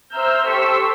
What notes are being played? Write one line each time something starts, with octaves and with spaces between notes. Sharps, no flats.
C5 E5 A#5 E6 F6 G6
G4 A4 C5 C#6 E6 B6